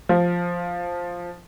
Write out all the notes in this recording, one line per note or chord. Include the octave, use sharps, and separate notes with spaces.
F3